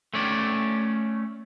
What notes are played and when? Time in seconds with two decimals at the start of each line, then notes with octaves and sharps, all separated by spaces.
0.14 A3 C#4 D5